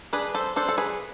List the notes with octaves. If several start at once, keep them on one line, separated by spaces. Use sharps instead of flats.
D4 G#4 B4
A4 C5
D4 A4 C5
A4
G#4 B4